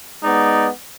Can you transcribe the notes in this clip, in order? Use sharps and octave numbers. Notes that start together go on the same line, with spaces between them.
G#3 B3 D#4 D5